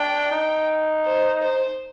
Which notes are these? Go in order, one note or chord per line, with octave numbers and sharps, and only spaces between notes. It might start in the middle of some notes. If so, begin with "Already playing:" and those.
Already playing: D4 G5
D#4
C5
C5